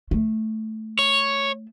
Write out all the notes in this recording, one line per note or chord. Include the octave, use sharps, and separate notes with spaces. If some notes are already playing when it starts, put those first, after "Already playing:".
A3
C#5